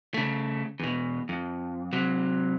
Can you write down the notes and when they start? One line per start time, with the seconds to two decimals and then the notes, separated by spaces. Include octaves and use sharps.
0.14 C#3 A3
0.80 E2 B2
1.29 F2
1.93 C3 F#3